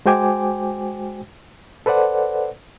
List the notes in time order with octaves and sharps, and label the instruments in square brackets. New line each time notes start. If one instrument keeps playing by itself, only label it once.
[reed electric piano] G#3 F#4 C5 G5 G#5 D6
A4 B4 C5 D5 F#5